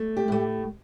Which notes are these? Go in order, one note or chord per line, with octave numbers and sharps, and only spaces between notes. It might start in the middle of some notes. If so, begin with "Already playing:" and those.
Already playing: A3
G4
A2 A3